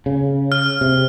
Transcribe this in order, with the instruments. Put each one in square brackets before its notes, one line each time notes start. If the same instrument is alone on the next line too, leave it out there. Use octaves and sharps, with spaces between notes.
[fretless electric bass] C#3
[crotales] F6
[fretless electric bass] C3